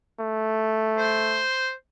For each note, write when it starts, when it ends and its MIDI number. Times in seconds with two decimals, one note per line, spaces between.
0.20 1.44 57
0.98 1.71 72